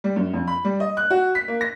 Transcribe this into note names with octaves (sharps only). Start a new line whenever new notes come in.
G3
F#2
F2
B5
G3
D#5
F#6
F#4
B6
A#3
A#6